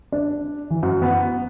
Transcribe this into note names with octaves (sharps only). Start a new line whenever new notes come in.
D4
E3
F#2
B3